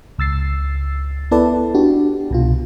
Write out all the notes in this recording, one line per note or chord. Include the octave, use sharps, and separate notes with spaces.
C#2 E6 A6 C7
B3 E4 A4 B4 D5 A5
D4 F#4 G4
C2 B2 F4